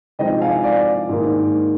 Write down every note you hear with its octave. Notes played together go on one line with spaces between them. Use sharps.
C3 F3 G#3 C4 D#4 D#5 G5
F5 G#5
D5 F5
G#2 D#3 A#3